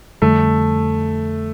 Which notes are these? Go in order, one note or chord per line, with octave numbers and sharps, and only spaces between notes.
F2 D3 G3 A3